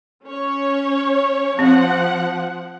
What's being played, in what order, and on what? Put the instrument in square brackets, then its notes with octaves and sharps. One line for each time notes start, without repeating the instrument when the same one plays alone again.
[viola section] C#4 C#5
[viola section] F3 F#5 [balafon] C4